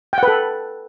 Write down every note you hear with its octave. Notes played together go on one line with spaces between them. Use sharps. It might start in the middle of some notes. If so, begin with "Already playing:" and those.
A4 B4 F#5 G5